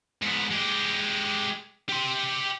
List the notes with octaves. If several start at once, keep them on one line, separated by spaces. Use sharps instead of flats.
G#2 B3
G#3 G4
G4 C6